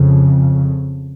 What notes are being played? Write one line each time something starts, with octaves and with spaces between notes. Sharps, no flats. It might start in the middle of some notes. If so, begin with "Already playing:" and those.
Already playing: F2 C#3